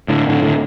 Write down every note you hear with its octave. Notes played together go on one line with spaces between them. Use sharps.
A2 D3
A2 D3
A2 D3